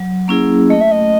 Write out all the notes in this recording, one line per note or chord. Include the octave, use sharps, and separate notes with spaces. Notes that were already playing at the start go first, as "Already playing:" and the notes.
Already playing: F#3
A#3 C#4 E4 G#4
A3 D#5
E5
D#5